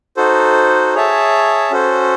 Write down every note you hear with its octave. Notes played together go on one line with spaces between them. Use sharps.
D#4 F#4 A4 C5
G#4 C#5 E5 A5
C#4 F#4 A4 C5